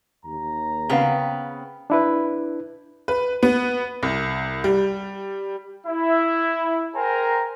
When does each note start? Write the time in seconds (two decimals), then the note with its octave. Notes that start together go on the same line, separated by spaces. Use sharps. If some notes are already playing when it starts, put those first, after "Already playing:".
0.24 D#2 A#5
0.89 C#3 B3 C4 B4 F5 G5
1.90 D4 E4 B4
3.08 B4
3.43 B3
4.03 C2
4.64 G3
5.87 E4 E5
6.95 G#4 A#4 C5 G5 G#5 A#5